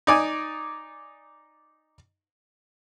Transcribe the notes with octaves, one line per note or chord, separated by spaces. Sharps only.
D#4 D5 G#5